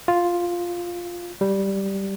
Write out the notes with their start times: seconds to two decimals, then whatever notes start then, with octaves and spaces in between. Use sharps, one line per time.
0.08 F4
1.41 G3